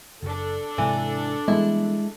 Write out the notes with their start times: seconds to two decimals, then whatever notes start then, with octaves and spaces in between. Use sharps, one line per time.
0.23 F#1 D4 A4
0.78 G#2 C3 E3
1.48 E3 G3 G#3 B3 E4